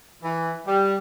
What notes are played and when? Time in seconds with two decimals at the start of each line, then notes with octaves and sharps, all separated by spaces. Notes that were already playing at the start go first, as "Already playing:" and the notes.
0.23 E3
0.66 G3